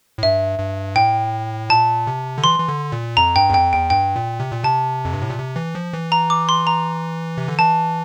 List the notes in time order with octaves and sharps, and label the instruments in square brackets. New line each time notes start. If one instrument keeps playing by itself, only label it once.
[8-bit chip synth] A2
[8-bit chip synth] G2 [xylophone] E5
[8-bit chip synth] G2
[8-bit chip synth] A2 [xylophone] G5
[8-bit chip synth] A#2 [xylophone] A5
[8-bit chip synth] C3
D3
[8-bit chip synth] E3 [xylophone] C6
[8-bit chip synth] E3
D3
A#2
[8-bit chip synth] F2 [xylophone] A#5
[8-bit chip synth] G2 [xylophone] G5
[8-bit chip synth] E2
[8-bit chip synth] F2 [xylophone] G5
[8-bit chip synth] E2 [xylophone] G5
[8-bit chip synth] G2 [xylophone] G5
[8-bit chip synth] A#2
C3
A#2
[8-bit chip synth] C3 [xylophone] A5
[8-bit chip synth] F2
G2
A2
A#2
C3
E3
F3
E3
[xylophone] A#5
D6
C6
A#5
[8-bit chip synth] C3
D3
[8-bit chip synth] E3 [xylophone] A5